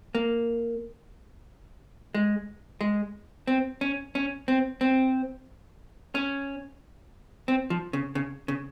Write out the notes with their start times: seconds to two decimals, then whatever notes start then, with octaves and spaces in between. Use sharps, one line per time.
0.15 A#3
2.15 G#3
2.81 G#3
3.47 C4
3.81 C#4
4.15 C#4
4.48 C4
4.81 C4
6.15 C#4
7.48 C4
7.70 F3
7.93 C#3
8.15 C#3
8.48 C#3